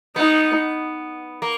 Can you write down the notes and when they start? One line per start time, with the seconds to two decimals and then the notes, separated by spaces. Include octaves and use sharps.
0.16 B3 D#4
1.42 A#3